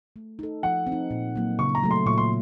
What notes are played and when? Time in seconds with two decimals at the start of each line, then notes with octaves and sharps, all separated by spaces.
0.16 A3
0.39 D#4 A4
0.63 F3 F#5
0.87 C4
0.92 D#4
1.10 A#2
1.36 F#3 A#3
1.59 C#3 C#6
1.75 A#5
1.83 F#3 A3
1.91 C6
2.06 A#2 C#6
2.18 C6